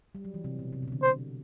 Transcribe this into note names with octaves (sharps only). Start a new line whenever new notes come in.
G3
F#3
E3
C3
B2
C3
B2
C3
D3
C5